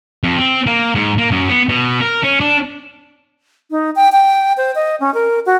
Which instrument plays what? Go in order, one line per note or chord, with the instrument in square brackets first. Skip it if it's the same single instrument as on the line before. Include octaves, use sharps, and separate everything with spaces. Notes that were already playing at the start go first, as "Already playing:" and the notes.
[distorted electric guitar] F2
C4
A#3
G#2
A#3
F#2
B3
B2
A#4
C#4
D4
[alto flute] D#4
G5
G5
C5
D#5
C#4
A#4
F#4